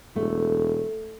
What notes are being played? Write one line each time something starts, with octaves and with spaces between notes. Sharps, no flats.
E1 A3